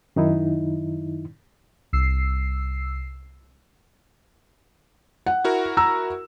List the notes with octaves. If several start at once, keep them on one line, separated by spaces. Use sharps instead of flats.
F#2 D#3 D#4 E4
C2 E6 C7
F#5
E4 F#4 A#4
A#5 E6